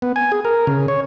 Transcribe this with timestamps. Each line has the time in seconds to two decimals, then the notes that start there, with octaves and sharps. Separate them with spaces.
0.02 B3
0.16 G#5
0.32 G#4
0.45 A#4
0.67 C#3
0.88 C#5